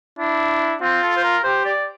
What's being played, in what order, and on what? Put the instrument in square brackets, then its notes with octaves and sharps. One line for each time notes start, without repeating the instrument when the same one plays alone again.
[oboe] D4 [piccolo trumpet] E4
[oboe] C4 [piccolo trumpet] F4
[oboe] A4
C5
A#4
[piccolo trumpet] G4 [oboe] C5
[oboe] D5